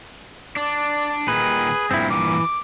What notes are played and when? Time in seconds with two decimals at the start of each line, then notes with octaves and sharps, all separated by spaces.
0.57 D4 D5
1.28 A#2 D#3 G#4 B4
1.91 G2 A#2 C4 E4
2.11 E3 D6